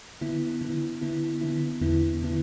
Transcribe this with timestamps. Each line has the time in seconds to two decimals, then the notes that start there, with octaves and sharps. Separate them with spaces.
0.21 D3 B3 E4
0.61 D3 B3 E4
1.01 D3 B3 E4
1.41 D3 B3 E4
1.81 E2 D3 B3 E4
2.22 D3 B3 E4